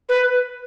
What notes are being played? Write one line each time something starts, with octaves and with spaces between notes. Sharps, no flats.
B4